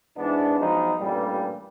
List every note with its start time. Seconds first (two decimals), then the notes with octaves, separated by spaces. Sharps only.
0.17 G#2 E3 B3 D4
0.58 F3 F#3 G#3 B3 D#4
0.99 A1 G2 A#2 E3 G3